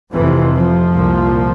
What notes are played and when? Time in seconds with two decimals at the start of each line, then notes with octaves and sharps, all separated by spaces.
0.13 F1 F2 C3 E3
0.54 F3
0.94 C2 A#2